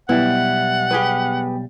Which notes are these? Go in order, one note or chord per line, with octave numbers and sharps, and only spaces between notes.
B1 G3 B3 E4 F#5
G4 G#4 B4